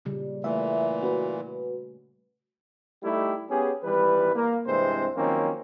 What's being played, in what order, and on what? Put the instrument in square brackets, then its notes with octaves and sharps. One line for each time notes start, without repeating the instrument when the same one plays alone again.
[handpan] A#2 C#3 G3
[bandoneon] A#2 E3 [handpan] A3 [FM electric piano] E5
[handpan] C#4 [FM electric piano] F#4 B4
[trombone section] G3 A3 D#4 E4 G4
B3 C#4 G4 G#4
G#1 E3 G3 B4
A#3
G2 C3 E3 G#3 C4 C5
D#3 F3 F#3 A#3 C4 C#4